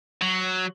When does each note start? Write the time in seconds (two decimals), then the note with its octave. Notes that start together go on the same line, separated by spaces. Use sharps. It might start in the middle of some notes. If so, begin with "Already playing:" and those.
0.21 F#3